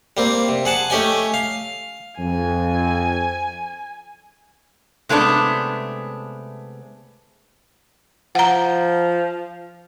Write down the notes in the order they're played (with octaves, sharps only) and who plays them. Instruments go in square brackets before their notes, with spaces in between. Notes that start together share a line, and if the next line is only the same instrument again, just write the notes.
[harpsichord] G3 A#3 C4
C3
G#4 F#5 A5
A3 C#4 G4 D#5 G#5
F5
[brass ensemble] F2 [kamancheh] G#5
[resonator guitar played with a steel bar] C3 G#3 A3 B3 D4
[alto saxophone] F3 [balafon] F#5 A#5